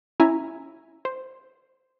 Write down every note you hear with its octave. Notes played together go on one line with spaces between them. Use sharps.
C#4 E4 E5 G#5 A#5
C5